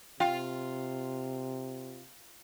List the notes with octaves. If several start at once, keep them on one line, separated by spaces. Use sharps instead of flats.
C3 F4 G5